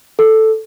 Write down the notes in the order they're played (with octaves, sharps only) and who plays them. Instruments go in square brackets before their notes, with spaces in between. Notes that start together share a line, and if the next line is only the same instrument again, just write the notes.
[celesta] A4